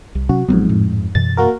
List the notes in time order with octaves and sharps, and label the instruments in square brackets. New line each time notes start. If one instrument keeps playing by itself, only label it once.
[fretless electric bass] C2
[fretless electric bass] C3 F#3 C#4 [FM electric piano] F#4
[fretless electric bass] A1 F#3 B3 [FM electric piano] F2 G#2
[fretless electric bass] A2
[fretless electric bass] F#2 B2 E3 [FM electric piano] A6
[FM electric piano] A#3 F#4 A#4